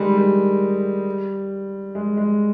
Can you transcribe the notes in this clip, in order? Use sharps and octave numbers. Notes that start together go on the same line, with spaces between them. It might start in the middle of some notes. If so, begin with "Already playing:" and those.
Already playing: D#3 G3 G#3
G3
G#3
G#3